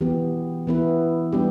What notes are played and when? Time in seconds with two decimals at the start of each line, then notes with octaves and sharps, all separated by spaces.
0.01 E3 B3 G4
0.67 E3 B3 E4 B4
1.33 G3 B3 D4 G4